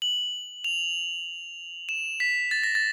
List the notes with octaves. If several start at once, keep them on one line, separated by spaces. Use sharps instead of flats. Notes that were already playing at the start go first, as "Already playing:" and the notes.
F#7
F7
E7
B6
A6
A#6
A6